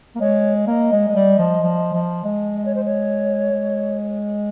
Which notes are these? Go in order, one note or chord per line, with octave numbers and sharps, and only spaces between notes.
A#3
G#3 C#5
A#3 D#5
G#3
G#3
G3
F3
F3
F3
G#3
D#5
C#5
C5
C#5
G#3